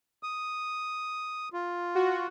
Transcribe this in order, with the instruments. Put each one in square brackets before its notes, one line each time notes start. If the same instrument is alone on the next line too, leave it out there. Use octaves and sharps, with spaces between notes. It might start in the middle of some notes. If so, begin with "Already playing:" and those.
[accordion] D#6
F4
[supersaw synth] F#4